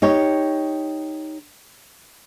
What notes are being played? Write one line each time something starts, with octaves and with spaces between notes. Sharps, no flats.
D#4 G4 C#5